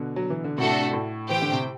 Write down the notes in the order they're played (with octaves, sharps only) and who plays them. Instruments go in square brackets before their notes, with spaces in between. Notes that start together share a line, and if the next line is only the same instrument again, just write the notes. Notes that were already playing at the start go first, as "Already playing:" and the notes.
Already playing: [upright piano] B2 D3
F#3
E3
D3
[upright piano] A2 C3 [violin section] A3 D4 F#4 A4
[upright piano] A2
[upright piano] E3 [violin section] G4 C5 G5
[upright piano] D3
C3